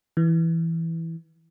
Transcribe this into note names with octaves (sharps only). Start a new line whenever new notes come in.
E3